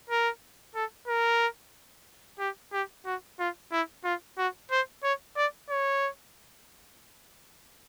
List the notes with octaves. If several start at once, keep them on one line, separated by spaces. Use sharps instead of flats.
A#4
A4
A#4
G4
G4
F#4
F4
E4
F4
F#4
C5
C#5
D5
C#5